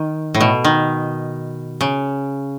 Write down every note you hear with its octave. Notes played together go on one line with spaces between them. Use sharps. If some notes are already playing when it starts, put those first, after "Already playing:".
Already playing: D#3
A2
B2
D#3
C#3